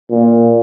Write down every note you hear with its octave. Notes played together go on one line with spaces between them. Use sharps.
A#2